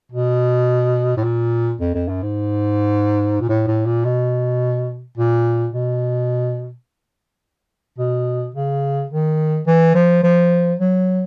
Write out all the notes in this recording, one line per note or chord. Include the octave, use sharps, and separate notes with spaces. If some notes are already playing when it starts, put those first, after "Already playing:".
B2
A2
A#2
F2
F2
F#2
G#2
A#2
A2
A2
A#2
B2
A#2
B2
B2
C#3
D#3
E3
F3
F3
F#3